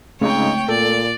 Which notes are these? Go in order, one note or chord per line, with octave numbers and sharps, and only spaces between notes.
C#3 G#3 A3 C4 D#4 C#5 G5
A#2 A4 D5